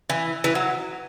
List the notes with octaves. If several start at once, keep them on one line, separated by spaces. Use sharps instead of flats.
E3
E3
F#3